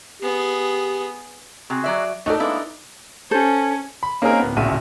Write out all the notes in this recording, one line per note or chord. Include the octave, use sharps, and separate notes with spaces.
B3 G4 G#4
C3 F#4 G#4
F#3 D5 E5
F#3 A3 D#4 F#4 A4 D5
G#3 A#3 B3 D4 E4
C#4 A4 C5
B5
A#3 C4 C#4 D#4 G#4 A#4
D1 B3
D1 A#1 C#3 F#4 E5 D#7